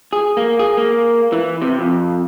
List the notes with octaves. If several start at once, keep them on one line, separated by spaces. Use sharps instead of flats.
G#4
A#3
G#4
A#3
E3
C3
F2